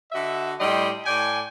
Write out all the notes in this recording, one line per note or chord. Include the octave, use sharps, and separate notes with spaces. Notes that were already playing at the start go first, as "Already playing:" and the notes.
D3 F#4 D#5 E5
A2 G3 D#5 G5 C6
A2 D5 G5 G#5